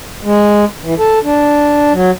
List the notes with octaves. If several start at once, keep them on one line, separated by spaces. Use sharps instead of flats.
G#3
E3
A4
D4
F#3